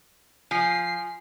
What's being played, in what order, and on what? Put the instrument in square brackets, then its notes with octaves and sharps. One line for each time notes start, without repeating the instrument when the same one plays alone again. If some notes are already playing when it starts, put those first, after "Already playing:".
[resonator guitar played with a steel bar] F3 [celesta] G#5 [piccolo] C7